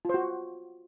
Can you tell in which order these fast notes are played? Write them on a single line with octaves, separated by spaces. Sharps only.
F4 C5 F#4